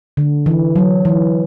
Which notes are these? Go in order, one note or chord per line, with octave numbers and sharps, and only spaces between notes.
D3
E3
F#3
E3